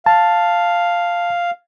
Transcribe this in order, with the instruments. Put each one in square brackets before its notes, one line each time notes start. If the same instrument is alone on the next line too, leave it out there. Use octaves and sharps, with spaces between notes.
[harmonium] F5 [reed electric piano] A5